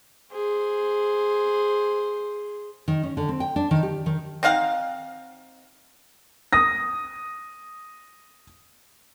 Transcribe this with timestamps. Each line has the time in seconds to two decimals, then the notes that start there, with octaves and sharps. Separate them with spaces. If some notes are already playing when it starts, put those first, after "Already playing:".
0.32 G#4 C5
2.88 D#3
3.03 C#4
3.17 D3
3.29 C4
3.40 G5
3.56 D4
3.71 D#3
3.83 G4
4.06 D#3
4.43 C4 D#4 F5 F#5
6.53 D#6 A#6